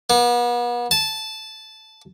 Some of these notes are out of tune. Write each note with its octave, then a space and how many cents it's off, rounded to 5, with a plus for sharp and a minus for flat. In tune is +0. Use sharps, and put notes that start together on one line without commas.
B3 -40
A5 -10